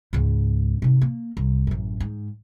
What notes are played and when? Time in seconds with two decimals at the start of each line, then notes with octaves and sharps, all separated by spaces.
0.13 C#2 G#2
0.82 G#2 C3
1.01 A#3
1.37 C2
1.67 A1 F#2
2.00 G#2